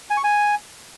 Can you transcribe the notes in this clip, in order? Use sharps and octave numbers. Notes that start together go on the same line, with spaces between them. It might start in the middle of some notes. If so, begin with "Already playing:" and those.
G#5
C#6
G#5